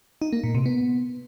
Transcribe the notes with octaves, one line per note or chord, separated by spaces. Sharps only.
D#4
A#3
A#2
C3
B3